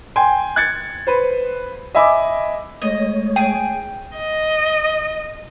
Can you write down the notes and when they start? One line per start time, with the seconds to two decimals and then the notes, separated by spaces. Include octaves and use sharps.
0.16 G5 G#5 C6
0.56 F#6 G#6 A6 C#7
1.07 B4 C5
1.95 D#5 E5 G#5 B5 D6
2.82 G#3 A3 C#5 D#5
3.36 G#4 G5
4.18 D#5